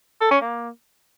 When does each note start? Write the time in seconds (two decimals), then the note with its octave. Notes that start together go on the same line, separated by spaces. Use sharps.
0.21 A4
0.31 C#4
0.41 A#3